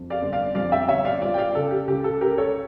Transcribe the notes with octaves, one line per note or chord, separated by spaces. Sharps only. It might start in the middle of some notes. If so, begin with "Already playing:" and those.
Already playing: F2
D5 F5
G1
D5 F5
F2 D5 F5
E5 G5
G1 C#5 E5
D5 F5
F3 D5 F5
G5
D5 F5
C#3 A4
G4
C#2 G4
A4
C#2 G4 A#4
A4 C#5